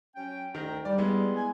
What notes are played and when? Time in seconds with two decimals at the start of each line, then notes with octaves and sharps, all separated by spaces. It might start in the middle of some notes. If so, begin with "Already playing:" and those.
0.16 F#3 C#4 G5
0.55 D2 D#3 G5 A#5
0.85 G3 D5
0.98 G#3 B3 E4
1.36 G#5